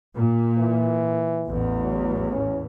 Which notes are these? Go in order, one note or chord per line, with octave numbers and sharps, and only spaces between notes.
A#2
E3
A1 E2
F#3
C#4